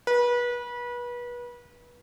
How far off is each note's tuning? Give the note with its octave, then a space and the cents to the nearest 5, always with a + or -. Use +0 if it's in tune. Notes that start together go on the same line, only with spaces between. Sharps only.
B4 -30